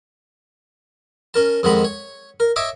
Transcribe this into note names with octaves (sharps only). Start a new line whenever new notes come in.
C#4 A#4 A5
F2 D#3 G#3 F#5 B5
C#5
A#4
C#5 D#5 E5 D6